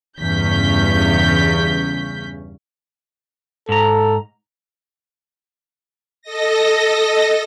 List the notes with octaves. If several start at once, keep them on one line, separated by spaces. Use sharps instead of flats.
E2 G2 C#3 C#4 G6 B6
G#2 A4 A#5
A4 D#5 A#6